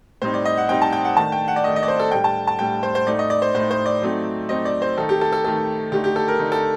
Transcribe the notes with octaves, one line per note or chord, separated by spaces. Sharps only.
A2 G3 C4 D#4 C5
D5
D#5
F#5
A2 G3 C4 D#4 G5
A5
G5
F#5
D#3 A3 D4 A5
G5
F#5
D5
D#3 A3 D4 D#5
D#5
D5
C5
A4
A2 G3 D4 G5
A5
A5
A2 G3 D4 G5
C5
C5
A2 A3 D#4 D5
D#5
D5
C5
A2 A3 D#4 C5
C5
D5
F#3 A3 C4 D#4
F#3 A3 C4 D#4 D#5
D5
C5
D#3 A3 D#4 A4
G4
A4
A4
D#3 A3 D#4 A4
D3 A3 D#4 G4
G4
A4
A#4
D3 A3 D#4
A4